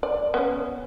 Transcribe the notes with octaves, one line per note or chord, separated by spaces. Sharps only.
D5
B3 C#4